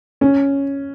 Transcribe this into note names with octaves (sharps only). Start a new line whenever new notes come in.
C#4